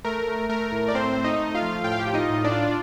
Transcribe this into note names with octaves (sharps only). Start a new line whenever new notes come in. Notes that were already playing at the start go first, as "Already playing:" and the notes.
A3 A#4
A3
A3 A#4
A2
D5
A3 C4 C5
A3
D#4 D#5
A3
F4 F5
F3
A2 G5
F5
G4 G5
F4
D#4 D#5
A2
D4 D5
F4